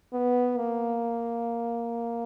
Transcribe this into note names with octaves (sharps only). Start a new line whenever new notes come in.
B3
A#3